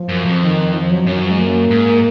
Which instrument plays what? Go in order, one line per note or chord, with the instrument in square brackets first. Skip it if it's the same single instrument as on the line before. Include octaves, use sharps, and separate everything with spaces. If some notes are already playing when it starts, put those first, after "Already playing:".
Already playing: [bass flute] F3
[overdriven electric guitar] F#2
F2
[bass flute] D#3
F3
F#3
[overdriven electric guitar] F#2
[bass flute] D#3
F3
G#3
A#3
[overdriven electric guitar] G#2